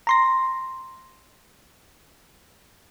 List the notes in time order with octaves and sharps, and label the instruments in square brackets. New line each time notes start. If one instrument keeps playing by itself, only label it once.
[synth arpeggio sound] A#5 C6 A#6